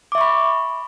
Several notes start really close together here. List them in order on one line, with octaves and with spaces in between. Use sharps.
D6 E5 C#6 B5